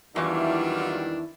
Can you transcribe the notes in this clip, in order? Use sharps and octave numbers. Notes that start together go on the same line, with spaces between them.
E2 D#3 E3 F#3 G3 D4 E4 F4